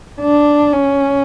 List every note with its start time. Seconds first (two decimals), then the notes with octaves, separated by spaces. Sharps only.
0.21 D4
0.73 C#4